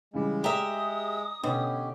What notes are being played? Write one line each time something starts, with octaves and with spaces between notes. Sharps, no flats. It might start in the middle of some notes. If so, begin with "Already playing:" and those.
C#3 E3 G3 G#3
G4 D5 E5 A#5 D#6
B2 D3 C#4 G4